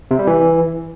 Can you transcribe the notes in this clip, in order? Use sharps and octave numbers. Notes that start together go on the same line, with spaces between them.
C3
G3
E3